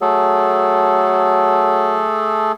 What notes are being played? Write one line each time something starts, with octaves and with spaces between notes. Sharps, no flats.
F#3 A3 G#4 A4